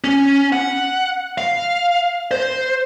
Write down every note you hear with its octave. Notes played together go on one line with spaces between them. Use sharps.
C#4
F#5
F5
C5